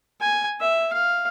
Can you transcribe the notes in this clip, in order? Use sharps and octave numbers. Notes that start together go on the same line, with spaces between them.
G#5
E5
F5